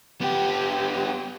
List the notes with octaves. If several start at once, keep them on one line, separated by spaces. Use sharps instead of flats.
B3 G4